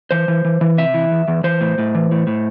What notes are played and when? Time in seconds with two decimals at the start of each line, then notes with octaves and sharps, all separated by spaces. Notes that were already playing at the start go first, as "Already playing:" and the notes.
0.11 E3 C5
0.28 E3
0.45 E3
0.61 E3
0.78 C3 E5
0.94 E3
1.12 E2
1.28 E2
1.44 E3 C5
1.61 A2
1.78 A2
1.95 E3
2.11 A2
2.27 A2